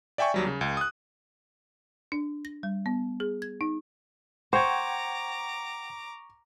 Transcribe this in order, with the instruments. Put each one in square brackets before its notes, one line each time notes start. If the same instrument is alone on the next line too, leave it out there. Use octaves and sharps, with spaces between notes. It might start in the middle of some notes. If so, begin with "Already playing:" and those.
[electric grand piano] D5 E5 G5 G#5 C#6
D#2 F#3 G3
C#3
C#2
D#6 F#6
[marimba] D4
A#6
G3
B3
G#4
G#6
D#4
[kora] C5 [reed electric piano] F#5 G5 G#6 [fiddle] A#5 D6 [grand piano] C#6